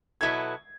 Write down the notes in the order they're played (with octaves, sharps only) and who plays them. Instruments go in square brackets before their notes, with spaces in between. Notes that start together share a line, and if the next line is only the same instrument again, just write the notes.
[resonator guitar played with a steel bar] B2 F#3 B3 E4 A4 [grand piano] G#6